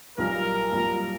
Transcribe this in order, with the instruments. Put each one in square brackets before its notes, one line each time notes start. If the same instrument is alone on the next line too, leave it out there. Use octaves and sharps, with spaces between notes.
[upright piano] B1 A#2 G3 A#3 [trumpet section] A#4
[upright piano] B1 A#2 G3 A#3